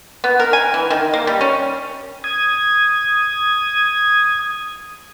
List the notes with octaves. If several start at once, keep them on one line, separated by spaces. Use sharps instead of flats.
B3
A#4
G#5
E3
D#3
A#3
G3
C#4
D#6 G#6